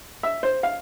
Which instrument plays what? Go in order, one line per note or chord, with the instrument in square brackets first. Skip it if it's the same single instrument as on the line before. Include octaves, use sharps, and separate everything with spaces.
[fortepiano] E5
C5
F5